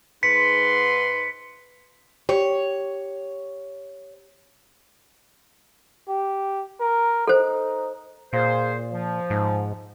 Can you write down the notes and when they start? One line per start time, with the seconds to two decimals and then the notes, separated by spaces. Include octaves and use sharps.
0.23 G#2 B4 C6 B6 C#7
2.29 G4 C#5
6.08 G4
6.80 A#4
7.28 D#4 A4 C5
8.33 A#2 F4 G#4 C5
8.91 F3
9.30 G#2